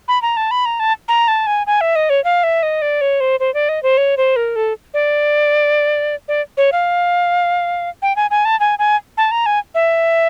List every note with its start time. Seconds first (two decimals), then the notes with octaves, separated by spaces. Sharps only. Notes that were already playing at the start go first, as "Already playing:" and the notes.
0.08 B5
0.22 A#5
0.37 A5
0.51 B5
0.65 A#5
0.80 A5
1.08 A#5
1.28 A5
1.47 G#5
1.67 G#5
1.81 E5
1.96 D#5
2.10 C#5
2.24 F5
2.43 E5
2.63 D#5
2.82 D5
3.01 C#5
3.20 C5
3.40 C5
3.54 D5
3.69 D#5
3.83 C5
3.97 C#5
4.17 C5
4.36 A#4
4.56 A4
4.94 D5
6.28 D5
6.57 C#5
6.72 F5
8.02 G5
8.16 G#5
8.31 G#5
8.45 A5
8.60 G#5
8.79 G#5
9.17 A5
9.31 A#5
9.46 G#5
9.75 E5